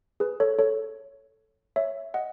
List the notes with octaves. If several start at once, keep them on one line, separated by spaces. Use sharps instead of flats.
G#4 B4
A4 C#5
A4 C#5
C#5 E5
D#5 F#5